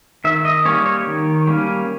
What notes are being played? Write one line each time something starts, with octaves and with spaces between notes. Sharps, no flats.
D#3 E5
D#5
G3 A#3 C#4 C#5
C#5
D#3
G3 A#3 C#4